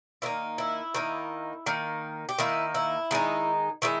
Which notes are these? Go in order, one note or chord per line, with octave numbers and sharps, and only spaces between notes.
D#3 A#3 D#4 E4
E4
D#3 A#3 D#4
D#3 A#3 D#4
G4
D#3 A#3 D#4 E4
E4
D#3 G#3 D#4
D#3 G#3 E4